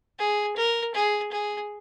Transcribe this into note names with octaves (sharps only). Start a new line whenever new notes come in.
G#4
A#4
G#4
G#4